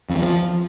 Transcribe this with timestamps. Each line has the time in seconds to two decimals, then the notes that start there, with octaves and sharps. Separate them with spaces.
0.09 F2
0.16 E2
0.22 F3